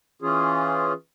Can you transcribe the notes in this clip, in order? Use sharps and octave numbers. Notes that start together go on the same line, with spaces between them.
E3 C#4 F4 G#4